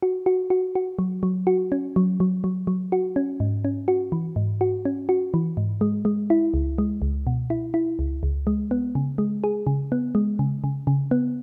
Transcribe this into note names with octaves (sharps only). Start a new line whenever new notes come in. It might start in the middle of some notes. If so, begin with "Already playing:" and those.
F#4
F#4
F#4
F#4
F#3
F#3
F#4
C#4
F#3
F#3
F#3
F#3
F#4
C#4
G#2
C#4
F#4
E3
G#2
F#4
C#4
F#4
E3
G#2
G#3
G#3
E4
C#2
G#3
C#2
B2
E4
E4
C#2
C#2
G#3
B3
C#3
G#3
G#4
C#3
B3
G#3
C#3
C#3
C#3
B3